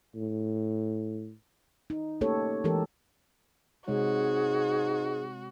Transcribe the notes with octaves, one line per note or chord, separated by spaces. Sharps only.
A2
D#4
A3 A#3 C#4 G4 A4 C#5
E3 G#3 G4 A4 A#4
G#2 C3 G#3 F#4 G#4 C#5